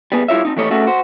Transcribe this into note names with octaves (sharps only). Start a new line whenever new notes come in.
G3 B3 G#4
G3 E4 F4 C#5 E5
C4 D#4
E3 G3 A3 C#5 D#5
A3 C#4 F#4 G#4 E5
F#4 C5